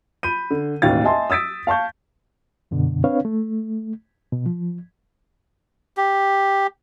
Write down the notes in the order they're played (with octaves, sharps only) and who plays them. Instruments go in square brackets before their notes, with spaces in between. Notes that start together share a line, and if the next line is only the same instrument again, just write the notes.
[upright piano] B5 G6 D#7
D3
E1 A1 D#2 F5 A6
D#5 E5 G#5 A5 C6
D#6 E6 A6 B6 D7
F5 A5 C#6 G6
[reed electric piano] F#2 B2 D3
C4 D4 B4 C#5 F5
A3
B2
F3
[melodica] G4